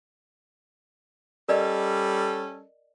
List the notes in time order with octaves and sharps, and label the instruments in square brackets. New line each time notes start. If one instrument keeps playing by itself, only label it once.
[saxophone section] G3 C#4 A4 [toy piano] A#4 D5 D#5